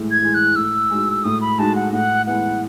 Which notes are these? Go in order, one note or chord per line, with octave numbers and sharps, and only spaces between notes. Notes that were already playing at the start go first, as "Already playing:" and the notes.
Already playing: A2 E3 G#3
G#6
E3 G#3
F#6
A2 E6
G#3 D#4 F#4
A2 D#6
B5
G#3 D#4 F#4 A5
F#5
A2 F#5
E3 G#3 B3 E4 F#5